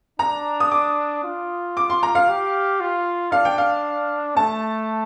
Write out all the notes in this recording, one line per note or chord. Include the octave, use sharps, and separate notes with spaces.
D4 A#5
D#6
D6
F4
D6
C6
A#5
F5
G4
F4
D4 F5
G5
F5
A3 A5